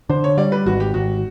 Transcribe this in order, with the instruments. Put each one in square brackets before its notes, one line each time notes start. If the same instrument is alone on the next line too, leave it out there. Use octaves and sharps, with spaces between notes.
[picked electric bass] D3 [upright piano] C5
[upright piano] C#5
[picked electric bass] G3 [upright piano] D5
[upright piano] B4
[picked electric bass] G#1 [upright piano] F#4
[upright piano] G4
[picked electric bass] G#1 [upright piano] F#4